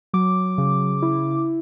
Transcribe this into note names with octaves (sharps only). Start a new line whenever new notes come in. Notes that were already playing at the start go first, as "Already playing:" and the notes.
F#3 D6
C#3
E4